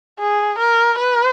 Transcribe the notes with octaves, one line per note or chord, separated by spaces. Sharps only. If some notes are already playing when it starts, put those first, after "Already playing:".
G#4
A#4
B4